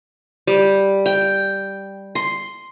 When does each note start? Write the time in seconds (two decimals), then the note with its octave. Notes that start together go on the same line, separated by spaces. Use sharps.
0.47 G3
1.06 G5
2.15 C6